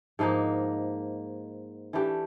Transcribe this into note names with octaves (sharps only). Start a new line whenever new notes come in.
G#2 F3 A#3 D#4
E3 A3 D4 G4